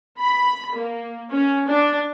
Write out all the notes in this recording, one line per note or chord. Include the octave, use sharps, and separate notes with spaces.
B5
A#3
C#4
D4